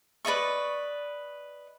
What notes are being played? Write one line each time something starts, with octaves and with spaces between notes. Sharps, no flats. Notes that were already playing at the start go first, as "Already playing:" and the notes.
B4 D5 D#5 C#6